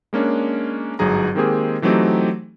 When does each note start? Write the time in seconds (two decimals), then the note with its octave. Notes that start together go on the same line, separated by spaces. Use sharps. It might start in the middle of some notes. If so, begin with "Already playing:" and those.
0.13 G#3 A#3 C#4 D4
0.99 G1 G#2 F#3 G#4 A#5
1.35 D#3 G#3 A#3 C4 G4 G#4
1.82 E3 F#3 A3 C4 D#4 G4